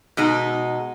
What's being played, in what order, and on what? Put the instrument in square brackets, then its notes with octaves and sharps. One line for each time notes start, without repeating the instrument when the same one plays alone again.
[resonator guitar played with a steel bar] B2 G#3 D#4